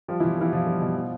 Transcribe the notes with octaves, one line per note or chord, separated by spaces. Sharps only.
F3 G3 F4
E3 E4
B2
E3 G3 E4
B2 F3 F4
G3
B2
F3